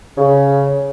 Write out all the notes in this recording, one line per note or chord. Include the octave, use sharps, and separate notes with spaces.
C#3